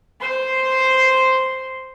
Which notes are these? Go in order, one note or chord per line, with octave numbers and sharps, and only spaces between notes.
C5 C6